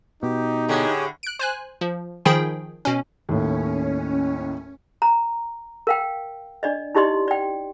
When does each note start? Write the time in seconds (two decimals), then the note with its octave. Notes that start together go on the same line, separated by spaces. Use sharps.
0.23 B2 D#4 G4
0.69 A2 D3 G4 G#4 C#5
1.23 F#6 D7
1.39 C5 G#5 F#6
1.81 F3
2.25 D#3 F3 G#4 G5 B5
2.85 B2 C#4
3.29 D#2 A2 C#4
5.02 A#5
5.87 A#4 F5 G5
6.63 D4 D5 D#5
6.95 D#4 E4 G4 D5 D#5 C6
7.28 D5 G5